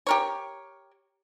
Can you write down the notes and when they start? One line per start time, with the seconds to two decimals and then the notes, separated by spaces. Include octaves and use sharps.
0.07 G4 A#4 C#5